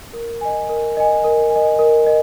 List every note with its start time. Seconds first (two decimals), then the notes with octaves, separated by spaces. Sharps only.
0.13 A#4
0.41 D#5 G#5
0.69 A#4
0.97 D#5 G#5
1.24 A#4
1.50 G#5
1.56 D#5
1.79 A#4
2.07 D#5